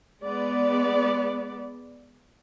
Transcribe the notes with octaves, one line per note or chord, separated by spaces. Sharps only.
G#3 B3 D5